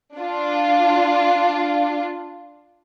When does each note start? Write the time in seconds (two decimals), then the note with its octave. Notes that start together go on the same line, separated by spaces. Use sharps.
0.16 D4 F4